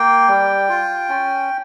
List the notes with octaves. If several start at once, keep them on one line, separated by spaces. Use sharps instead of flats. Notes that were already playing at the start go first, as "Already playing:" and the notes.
Already playing: A#3 G5
G3
F4
C#4